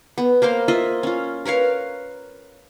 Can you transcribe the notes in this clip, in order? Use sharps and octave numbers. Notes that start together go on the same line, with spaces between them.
B3
A#3 A#4 C5 F5
F4 D#5 E5
C#4 F4
A#4 B4 C#5 F5